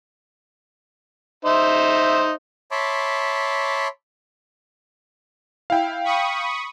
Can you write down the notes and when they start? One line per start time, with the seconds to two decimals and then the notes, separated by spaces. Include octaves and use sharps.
1.45 D#4 C5 E5
2.71 C#5 E5 A5 B5 C6 D6
5.70 E4 F5 G5
6.04 B5 C#6 D#6